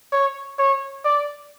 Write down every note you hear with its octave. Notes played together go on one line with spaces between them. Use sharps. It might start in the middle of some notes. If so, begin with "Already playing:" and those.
C#5
C#5
D5